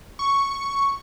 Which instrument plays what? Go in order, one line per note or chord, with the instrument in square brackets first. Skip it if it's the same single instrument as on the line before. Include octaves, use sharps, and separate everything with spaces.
[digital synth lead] C#6